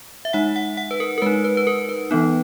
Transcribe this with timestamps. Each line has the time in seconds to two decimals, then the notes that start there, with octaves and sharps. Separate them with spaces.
0.25 E5
0.33 G#3 D#4 F#5
0.56 F#5
0.77 F#5
0.91 B4
1.00 A#4
1.18 A#4
1.22 G#3 D#4 B4
1.44 B4
1.57 B4
1.67 A#4
1.89 B4
2.11 E3 B3 D#4